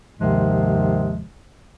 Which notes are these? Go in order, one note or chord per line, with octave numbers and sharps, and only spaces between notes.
D#2 G#2 C3 D#3 F3 G#3